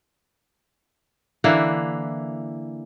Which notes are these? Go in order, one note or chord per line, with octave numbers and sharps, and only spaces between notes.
D3 E3 A#3 E4